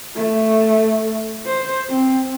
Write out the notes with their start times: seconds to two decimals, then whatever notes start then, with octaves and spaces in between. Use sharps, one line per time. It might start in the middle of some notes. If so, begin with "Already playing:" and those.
0.16 A3
1.46 C5
1.89 C4